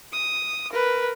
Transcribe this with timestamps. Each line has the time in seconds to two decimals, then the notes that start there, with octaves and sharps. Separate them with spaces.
0.13 D#6
0.71 A#4 B4